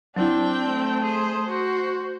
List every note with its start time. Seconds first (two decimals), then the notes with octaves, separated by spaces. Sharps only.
0.17 F#3 C4 D4 E4 G5
0.66 A3
1.03 G#4 C5
1.48 F#4 C5